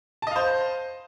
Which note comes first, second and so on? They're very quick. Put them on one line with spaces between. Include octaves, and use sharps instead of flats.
A5 D#5 F5 C5